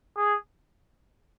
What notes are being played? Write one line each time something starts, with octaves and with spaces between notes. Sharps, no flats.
G#4